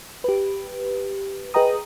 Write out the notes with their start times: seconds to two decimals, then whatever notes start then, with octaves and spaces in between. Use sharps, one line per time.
0.24 G4 B4
1.54 G#4 B4 D#5 G5 A#5 D#6